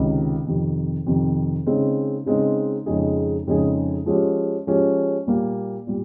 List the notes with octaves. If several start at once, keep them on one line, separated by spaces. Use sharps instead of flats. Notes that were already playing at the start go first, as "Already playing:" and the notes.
Already playing: C#2 C3 D#3
F2 C3 D#3
F2 C3 D#3
C#3 G#3 C4 D#4
C#3 G#3 C4 D#4
F2 C#3 G#3 D#4 G#4
F2 C#3 G#3 D#4 G#4
F3 G#3 C#4 G4
F3 G#3 C#4 G4
A#2 G3 A#3
A#2 G3